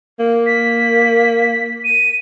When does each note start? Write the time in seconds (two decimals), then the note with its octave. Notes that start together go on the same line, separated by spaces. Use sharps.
0.19 A#3
0.46 B6
1.84 D#7